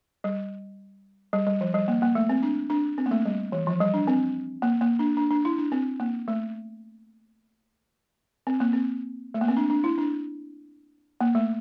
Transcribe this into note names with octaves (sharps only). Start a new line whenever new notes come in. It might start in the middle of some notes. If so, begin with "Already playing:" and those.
G3
G3
G3
F3
G3
A#3
A#3
A3
C4
D4
D4
C4
A#3
A3
G3
E3
F3
G3
D4
C4
A#3
A#3
D4
D4
D4
E4
D4
C4
A#3
A3
C4
A#3
C4
A3
A#3
C4
D4
D4
E4
D4
A#3
A3